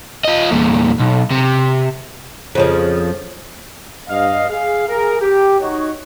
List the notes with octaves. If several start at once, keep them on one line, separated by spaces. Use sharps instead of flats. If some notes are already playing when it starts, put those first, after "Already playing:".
F4 D#5
E2 A#2
B1
C3
F2 C#3 F3
G2 D#5 F5
G#4 F5
G#4 A#4
G4
D#4 F#4 C#5